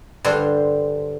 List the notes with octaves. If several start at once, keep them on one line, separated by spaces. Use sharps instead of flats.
G2 D3 C5